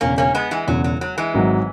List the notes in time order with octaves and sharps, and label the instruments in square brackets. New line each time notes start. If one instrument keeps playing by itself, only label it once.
[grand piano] E1 E2 C#3 [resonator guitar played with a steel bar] A#3 C#4
[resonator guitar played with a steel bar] A#3 C#4
G#3 B3
E3 G#3
[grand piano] E1 E2 C#3 [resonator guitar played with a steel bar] F#3
[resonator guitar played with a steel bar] F#3
F#3
E3 G#3
[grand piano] G#1 G#2 F#3